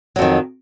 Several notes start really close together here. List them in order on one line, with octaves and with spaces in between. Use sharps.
F#3 F2 D#3